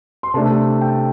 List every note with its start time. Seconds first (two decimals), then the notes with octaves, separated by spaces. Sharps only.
0.23 C6
0.34 C3 A3 D4 A5
0.81 G5